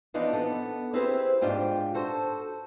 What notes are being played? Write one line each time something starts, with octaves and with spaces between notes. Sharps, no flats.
E3 F3 B3 D4 D#4 F4
B3 A4
C4 E4 G4 G#4 B4 C5
G#2 D4 F4 G4 G5
F#4 A4 C5